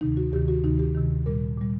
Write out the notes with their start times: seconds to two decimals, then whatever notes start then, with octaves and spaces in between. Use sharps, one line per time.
0.01 D2 C3 D#3 D#4
0.17 F#4
0.33 D2 C3 D#3 G4
0.48 F#4
0.64 D2 C3 D#3 D#4
0.79 G4
0.95 D2 C3 D#3
1.26 A#2 G3 A#4
1.57 A#2 G3